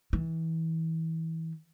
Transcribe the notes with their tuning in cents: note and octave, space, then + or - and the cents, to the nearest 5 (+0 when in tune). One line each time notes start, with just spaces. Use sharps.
E3 -25